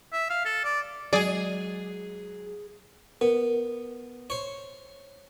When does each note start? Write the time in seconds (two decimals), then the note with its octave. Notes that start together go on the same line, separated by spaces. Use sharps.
0.13 E5
0.30 F5
0.45 A4
0.64 D5
1.13 F#3 G#3 G#4 D5 G#5
3.21 B3 A#4
4.30 C5 C#5